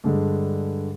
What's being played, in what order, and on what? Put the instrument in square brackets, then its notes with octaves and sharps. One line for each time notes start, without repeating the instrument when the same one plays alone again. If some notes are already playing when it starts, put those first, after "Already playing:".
[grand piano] G2 D3 G#3